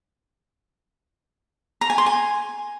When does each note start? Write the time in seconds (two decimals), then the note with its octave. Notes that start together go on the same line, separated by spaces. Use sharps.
1.81 A#5
1.90 G#5
1.98 C6
2.06 G#5